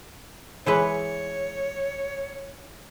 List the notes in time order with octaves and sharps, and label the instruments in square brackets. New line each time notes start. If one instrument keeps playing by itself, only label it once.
[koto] E3 G#3 B4 [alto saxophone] C#5